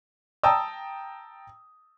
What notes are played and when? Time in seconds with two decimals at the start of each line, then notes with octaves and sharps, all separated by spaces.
0.43 G5 A5 A#5 D#6 E6